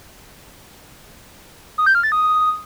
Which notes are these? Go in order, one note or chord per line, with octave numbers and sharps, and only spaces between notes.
D#6
G6
F6
A6
D#6